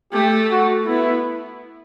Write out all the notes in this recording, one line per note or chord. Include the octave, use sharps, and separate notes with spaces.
A3 G4
F#4
B3 E4